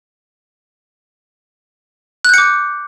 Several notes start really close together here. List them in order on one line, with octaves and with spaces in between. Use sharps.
F#6 G6 C#7 D6